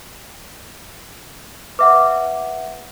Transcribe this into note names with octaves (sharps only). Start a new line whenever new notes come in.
B4 E5 F#5 D6